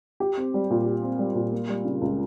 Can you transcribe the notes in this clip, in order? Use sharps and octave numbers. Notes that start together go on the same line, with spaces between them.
G4
C4
G3
A#2
G4
C4
G3
A#2
A#3
G3
C#3
C#2